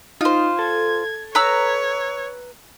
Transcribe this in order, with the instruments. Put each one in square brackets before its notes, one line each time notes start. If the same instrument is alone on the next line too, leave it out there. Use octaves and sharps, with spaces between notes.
[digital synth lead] D#4 [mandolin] F4 C5
[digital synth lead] A4 [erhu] G#6
[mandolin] B4 A#5 E6 [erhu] C#5